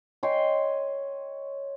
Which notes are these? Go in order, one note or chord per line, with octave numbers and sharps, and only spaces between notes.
C#5 D#5 G5 C6